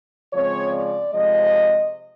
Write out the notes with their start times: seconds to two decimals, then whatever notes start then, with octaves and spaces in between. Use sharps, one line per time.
0.33 C#3 F3 G#3 C4 C#5
0.72 D5
1.12 C3 F3 G#3 D#5